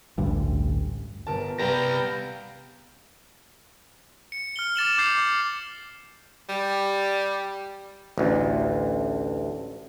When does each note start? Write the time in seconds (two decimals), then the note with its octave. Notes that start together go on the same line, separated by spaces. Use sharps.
0.18 A1 D2 G2
1.27 G1 A#4 A5
1.59 C2 G3 B3 B4 F5 G5 A#5
4.32 C#7
4.56 F6 C#7 G7
4.76 D6 A6 E7 F#7
4.98 D6 G6 C7
6.49 G3
8.18 A1 D2